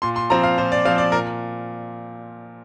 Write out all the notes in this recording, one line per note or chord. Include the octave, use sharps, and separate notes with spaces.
A#2 C6
C6
F3 C4 A#5
F5
A#2 C5
D5
F3 C4 F5
D5
A#2 A#4